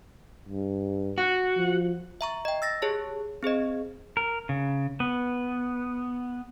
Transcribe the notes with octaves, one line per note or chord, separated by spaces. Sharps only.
G2
F#4
F3
E5 A#5 C#6
D#5 G5
E6 A6 A#6
G4 G#4 C#5 A5
C4 G#4 C5 D#5
A#4
C#3
B3